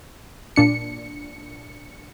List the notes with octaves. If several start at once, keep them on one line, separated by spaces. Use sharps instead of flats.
A#2 D4 C#7